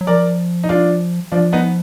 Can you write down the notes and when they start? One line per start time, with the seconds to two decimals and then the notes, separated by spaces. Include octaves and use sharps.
0.01 F#3
0.07 F3 A#4 D5
0.63 D#4
0.69 D4 F4
1.32 F3 D4 F4
1.53 B3 D#4